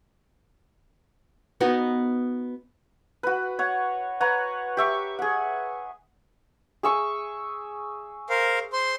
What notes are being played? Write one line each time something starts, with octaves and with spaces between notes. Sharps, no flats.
B3 D#4 F#4
F#4 B4
C#5 F#5
B4 C#5 F#5 A#5
G4 E5 C#6
G#4 F#5
G#4 E5 C#6
A#4 C5 F5
C5 C6